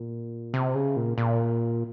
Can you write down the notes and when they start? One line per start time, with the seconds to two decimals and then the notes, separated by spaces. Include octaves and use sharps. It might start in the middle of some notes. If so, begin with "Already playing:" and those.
Already playing: A#2
0.54 C3
0.75 C#3
0.96 A#2
1.18 A#2